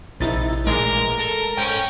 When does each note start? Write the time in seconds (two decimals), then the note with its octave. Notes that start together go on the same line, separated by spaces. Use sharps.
0.20 A#1 C3 D#4 E4 A6
0.67 A1 A#2 G#3 A#4
1.19 A4 A#4
1.57 G#2 C#4 G5